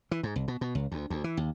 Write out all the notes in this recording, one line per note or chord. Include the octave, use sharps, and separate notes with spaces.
E3
G#2
C2
B2
B2
C#2
D2
D2
E3
D#2